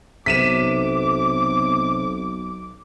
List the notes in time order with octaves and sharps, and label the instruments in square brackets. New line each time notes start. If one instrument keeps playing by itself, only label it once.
[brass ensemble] B1 [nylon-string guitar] C3 [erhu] D6 [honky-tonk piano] B6 D#7 E7